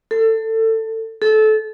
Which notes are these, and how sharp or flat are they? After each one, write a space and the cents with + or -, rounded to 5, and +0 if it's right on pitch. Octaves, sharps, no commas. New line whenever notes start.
A4 +20
A4 -25